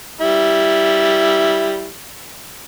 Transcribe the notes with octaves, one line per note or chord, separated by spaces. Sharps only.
G3 E4